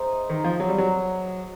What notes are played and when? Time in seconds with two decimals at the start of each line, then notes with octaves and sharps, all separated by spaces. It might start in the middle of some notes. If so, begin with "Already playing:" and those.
Already playing: D#4 G#4 C5 E5
0.30 D#3
0.44 F3
0.60 F#3
0.69 G3
0.78 F#3